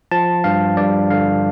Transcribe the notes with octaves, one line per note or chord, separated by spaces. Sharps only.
F3 A5
G2 F5
G2 D5
D3 F5